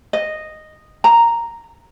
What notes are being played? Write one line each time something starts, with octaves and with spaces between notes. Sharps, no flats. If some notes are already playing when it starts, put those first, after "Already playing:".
D#5
A#5